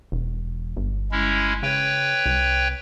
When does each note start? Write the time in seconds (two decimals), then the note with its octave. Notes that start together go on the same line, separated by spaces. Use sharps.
0.12 E1
0.76 G1
1.12 G#3 C#4 E4
1.63 C#3 B4 C#5 G5
2.26 C2